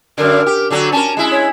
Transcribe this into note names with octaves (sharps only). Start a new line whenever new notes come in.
F#2 D3 A#4
G4
D3 F#3 A4
C#4 A#4 A5
G#3 E4
C#5